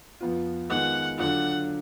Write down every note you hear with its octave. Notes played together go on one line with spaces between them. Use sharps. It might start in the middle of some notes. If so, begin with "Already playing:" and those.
F2 F3 B3 F4
D#3 G#3 B3 F4 F#5
D3 F#3 D4 F4 F#5